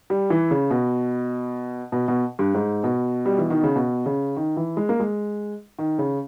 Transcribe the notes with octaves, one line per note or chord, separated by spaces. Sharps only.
G3
E3
C#3
B2
B2
B2
G2
G#2
B2
G3
E3
D#3
C#3
B2
C#3
D#3
E3
G#3
A#3
G#3
D#3
C#3